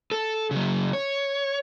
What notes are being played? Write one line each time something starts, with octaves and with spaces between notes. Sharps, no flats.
A4
C#3 F#3
C#5